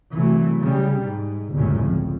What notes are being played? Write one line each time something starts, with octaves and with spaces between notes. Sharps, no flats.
C2 E3 F#3 A3
C#3 G3
G#2
G1 C#2 F#2 A2
F2